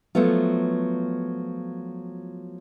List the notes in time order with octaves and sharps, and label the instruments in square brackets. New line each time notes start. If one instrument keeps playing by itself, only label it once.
[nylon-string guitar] F3 F#3 A3 B3 F4